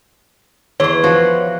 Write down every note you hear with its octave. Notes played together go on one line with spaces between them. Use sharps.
E2 C#5 C6
F3 F#4